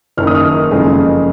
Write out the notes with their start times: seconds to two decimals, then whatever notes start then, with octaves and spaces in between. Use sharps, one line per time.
0.17 F#1 F#2 D#3 F6
0.27 D#6
0.35 F6
0.71 F#1 F2 C#3 G#3